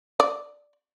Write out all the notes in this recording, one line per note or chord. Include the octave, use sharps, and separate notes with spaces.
D5